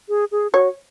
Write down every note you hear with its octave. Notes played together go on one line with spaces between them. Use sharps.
G#4
G#4
F#4 C#5